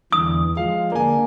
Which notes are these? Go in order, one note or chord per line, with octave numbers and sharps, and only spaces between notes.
E2 D3 E3 D#6
F3 G#3 F5
D3 A#3 D4 G#5